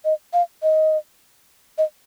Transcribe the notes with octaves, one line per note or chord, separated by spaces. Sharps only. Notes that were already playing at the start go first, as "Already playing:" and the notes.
D#5
F5
D#5
D#5